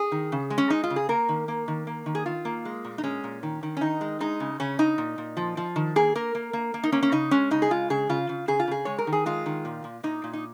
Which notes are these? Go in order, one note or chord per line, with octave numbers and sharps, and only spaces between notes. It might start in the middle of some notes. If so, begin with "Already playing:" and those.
Already playing: G#4
D#3
C#3
G#3
C#4
G#3 D#4
F4
C#3
G#4
A#3 A#4
D#3
A#3
D#3
A#3
D#3
G#4
D#3 F4
A#3
G#3
A#2
D#4
G#3 C#4
A#2
D#3
D#3
C#4
D#3 D#4
G#3
G#3 D#4
C#3
C#3 C#4
C#3 D#4
A#2
A#2
F3
F3
D#3
A#3 G#4
A#3 A#4
A#3
A#3
A#3
D#4
A#3 C#4
C#4
C#3 D#4
G#3 C#4
C#3 D#4
G#4
G#3 F4
C#3 G#4
C#3 F4
C#3
C#3 G#4
F4
C#3 G#4
G#3 C#5
A#4
D#3
G#4
G#3 F4
D#3
A#2
A#2
A#2 D#4
A#2
D#4